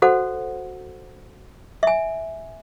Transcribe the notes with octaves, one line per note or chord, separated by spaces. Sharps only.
F#4 A4 C5 F#5
E5 G#5